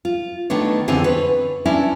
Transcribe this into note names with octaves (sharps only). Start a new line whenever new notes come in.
F4
D#3 A3 B3 D4 C#5
F2 D3 E3 C4 D4 G#4
B4 C#5
C#4 D4 E4 D5